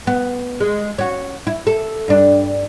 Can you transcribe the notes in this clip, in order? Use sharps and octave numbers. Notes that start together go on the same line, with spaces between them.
B3
G#3
C#4 F#4
E4
A4
G2 D4